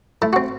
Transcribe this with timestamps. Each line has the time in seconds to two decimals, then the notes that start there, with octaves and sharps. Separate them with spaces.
0.22 A3 E4
0.33 C4 F#4